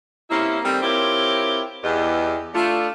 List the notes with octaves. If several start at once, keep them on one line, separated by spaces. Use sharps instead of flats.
C3 A#3 C#4 E4
D#3 G3 A3 C4
C4 E4 F4 G4 A#4 C#5
E2 G4 D#5
A3 D4 F4